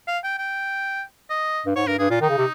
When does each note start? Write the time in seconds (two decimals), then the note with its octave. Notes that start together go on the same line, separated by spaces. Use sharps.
0.08 F5
0.24 G5
0.39 G5
1.30 D#5
1.66 G2
1.76 G#2 C#5
1.87 G2 A#4
1.99 G2 G#4
2.10 A#2 F4
2.21 D#3 D#4
2.29 C#3
2.38 C3